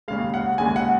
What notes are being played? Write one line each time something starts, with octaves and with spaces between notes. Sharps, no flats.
D#2 C#3 G#3 F5
F#5
D#2 C#3 G#3 G#5
F#5